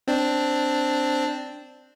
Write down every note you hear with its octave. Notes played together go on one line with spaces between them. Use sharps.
C4 D4